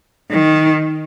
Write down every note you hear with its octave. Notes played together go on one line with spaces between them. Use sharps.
D#3